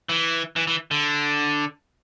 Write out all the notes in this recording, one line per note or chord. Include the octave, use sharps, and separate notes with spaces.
E3
E3
E3
D3